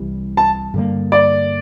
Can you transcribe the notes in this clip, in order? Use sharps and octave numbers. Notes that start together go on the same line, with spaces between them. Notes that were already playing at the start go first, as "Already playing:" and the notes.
Already playing: C2 C3 E3 G3
A5
G2 D3 G3 A#3
D5